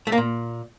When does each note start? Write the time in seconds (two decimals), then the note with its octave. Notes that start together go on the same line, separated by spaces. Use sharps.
0.07 A3
0.12 A#3
0.18 A#2